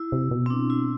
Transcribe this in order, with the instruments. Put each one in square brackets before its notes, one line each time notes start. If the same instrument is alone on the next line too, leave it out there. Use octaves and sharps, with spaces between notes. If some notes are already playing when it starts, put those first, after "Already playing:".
Already playing: [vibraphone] E4
[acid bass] C3
B2
[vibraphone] C4
D4
E4